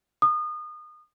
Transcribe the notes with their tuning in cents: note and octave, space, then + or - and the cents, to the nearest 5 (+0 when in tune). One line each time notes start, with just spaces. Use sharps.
D#6 -30